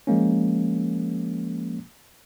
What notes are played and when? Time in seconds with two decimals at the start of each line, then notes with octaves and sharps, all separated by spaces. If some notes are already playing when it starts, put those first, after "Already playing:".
0.07 F3 G#3 A#3 C#4